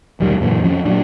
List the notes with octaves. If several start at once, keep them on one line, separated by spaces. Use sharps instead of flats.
E1 B1 D#3 G3
F#2 A#2 D3 E3
F2 F3 C#4
A#2 F#3 D4